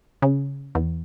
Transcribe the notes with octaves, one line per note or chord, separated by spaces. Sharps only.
C#3
E2